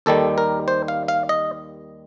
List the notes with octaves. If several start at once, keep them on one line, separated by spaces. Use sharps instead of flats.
D#2 D#3 G3 A4
A#4
C5
F5
F5
D#5